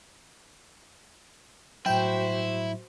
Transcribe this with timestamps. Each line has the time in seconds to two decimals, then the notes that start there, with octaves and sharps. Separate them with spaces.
1.86 A2 F#3 E4 F#4 C5 G5